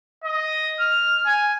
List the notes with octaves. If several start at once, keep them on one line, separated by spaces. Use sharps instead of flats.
D#5
F6
G#5